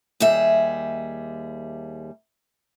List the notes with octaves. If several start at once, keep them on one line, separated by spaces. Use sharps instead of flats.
D#2 G3 G#4 E5